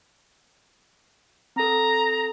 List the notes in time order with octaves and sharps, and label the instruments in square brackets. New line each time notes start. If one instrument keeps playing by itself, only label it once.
[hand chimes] C4 A4 [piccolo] A#5